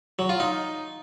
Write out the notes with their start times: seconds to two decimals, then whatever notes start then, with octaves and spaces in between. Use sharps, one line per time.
0.19 F#3
0.29 F4
0.40 D#4